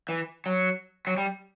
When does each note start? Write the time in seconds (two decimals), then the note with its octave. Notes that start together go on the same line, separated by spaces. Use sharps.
0.09 E3
0.46 F#3
1.07 F#3
1.17 G3